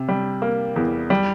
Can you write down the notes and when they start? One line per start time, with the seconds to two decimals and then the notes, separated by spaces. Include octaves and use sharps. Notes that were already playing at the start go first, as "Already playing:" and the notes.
Already playing: C3
0.09 G3
0.42 A#3
0.76 E2
1.10 G3